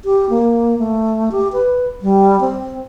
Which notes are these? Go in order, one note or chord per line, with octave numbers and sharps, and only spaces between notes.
G4
A#3
A3
G4
B4
G3
C4